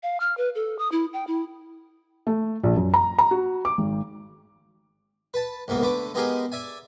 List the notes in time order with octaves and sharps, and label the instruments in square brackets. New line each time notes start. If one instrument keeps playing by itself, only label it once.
[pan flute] F5
F6
B4
A4
D#6
E4
G5
E4
[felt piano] A3
A#1
F#2
A#5
A#5
F#4
D6
G#1
[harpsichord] B4 A5
C2 G#2 A#3 B3
D3 A3 B4 D6
G#3 B3 D#4 G4 G#4 A#4
D5 E5 G#5